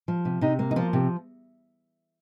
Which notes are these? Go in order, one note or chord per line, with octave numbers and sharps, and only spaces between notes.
F3
C3
C3 D#4
A#3
D#4
F3 F4
C3